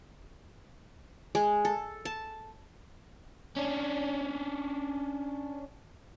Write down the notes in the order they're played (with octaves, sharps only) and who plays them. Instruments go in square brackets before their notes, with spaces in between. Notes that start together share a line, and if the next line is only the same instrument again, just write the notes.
[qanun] G#3
A4
A5
[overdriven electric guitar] C#4 D4